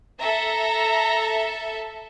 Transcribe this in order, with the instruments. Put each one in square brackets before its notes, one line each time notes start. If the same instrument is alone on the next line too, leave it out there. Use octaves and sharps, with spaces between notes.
[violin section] A4 E5 [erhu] A#5